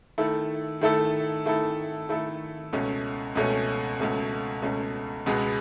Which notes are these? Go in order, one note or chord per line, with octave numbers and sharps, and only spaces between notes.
D#3 A3 E4 A4
D#3 A3 E4 A4
D#3 A3 E4 A4
D#3 A3 E4 A4
C#2 B2 A3 C#4
C#2 B2 A3 C#4
C#2 B2 A3 C#4
C#2 B2 A3 C#4
C#2 B2 G#3 B3